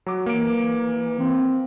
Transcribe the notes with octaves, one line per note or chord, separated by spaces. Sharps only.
F#3 D6
E3 A#3 D7
C4